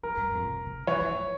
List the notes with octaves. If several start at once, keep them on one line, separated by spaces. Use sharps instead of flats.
F3 A#4
G2
G#2
F2
C3
C#3
E3 C#5
E3
F3